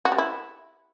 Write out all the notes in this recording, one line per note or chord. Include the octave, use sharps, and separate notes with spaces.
F#4
G3
E4